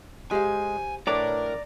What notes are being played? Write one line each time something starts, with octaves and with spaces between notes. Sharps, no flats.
G#3 G4 C5 F5 G#5
A2 D4 A#4 B4 C#5 D5 A#5 D6